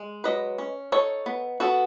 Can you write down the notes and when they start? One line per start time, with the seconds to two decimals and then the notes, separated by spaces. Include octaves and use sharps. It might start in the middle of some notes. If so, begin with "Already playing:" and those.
Already playing: G#3
0.24 F#3 B4 D#5
0.58 C#4
0.92 D#4 A4 C#5
1.26 B3
1.60 B3 F#4 A4